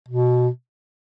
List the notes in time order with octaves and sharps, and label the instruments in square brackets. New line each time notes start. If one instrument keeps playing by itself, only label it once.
[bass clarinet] B2